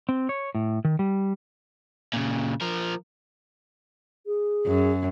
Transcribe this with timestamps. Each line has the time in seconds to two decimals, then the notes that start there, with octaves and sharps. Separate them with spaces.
0.09 C4
0.29 C#5
0.55 A2
0.85 D#3
0.99 G3
2.14 A#2 C#3
2.62 F3 A#4
4.27 G#4
4.67 F#2